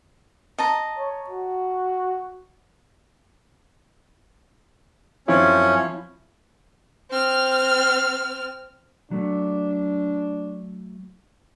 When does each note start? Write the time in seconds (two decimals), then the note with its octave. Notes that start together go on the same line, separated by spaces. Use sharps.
0.58 D#5 A5 A#5
0.98 C#5
1.30 F#4
5.28 F#2 F3 C4 C#4 E4 C#5
7.10 C4 F6
9.11 F#3 A3 D4